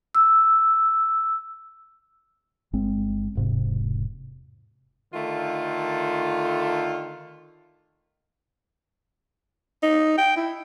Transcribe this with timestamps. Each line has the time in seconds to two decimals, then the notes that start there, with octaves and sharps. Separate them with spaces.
0.15 E6
2.73 G1 G#3 C4
3.35 E1 G#2 C3
5.14 D3 D#3 A3 F4
9.83 D#4
10.18 G5
10.37 E4